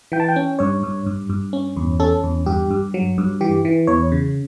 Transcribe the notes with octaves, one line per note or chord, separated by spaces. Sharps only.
E3 G5
A5
G5
C#4
G2 C#5
G2
G2
G2
C#4
E2
C#4 A4
E2
G2 G4
G2
F#3
G2
E3 G4
E3
E2 C#5
C#3